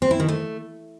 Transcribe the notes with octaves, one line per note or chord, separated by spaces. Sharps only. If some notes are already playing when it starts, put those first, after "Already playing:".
C4
E4
D#3
A3